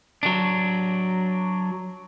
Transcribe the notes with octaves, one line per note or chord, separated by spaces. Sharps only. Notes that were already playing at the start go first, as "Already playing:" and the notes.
F#3 D4